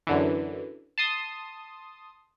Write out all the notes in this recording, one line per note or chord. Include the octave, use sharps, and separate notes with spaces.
F#2 D3 E3
A5 C6 D#6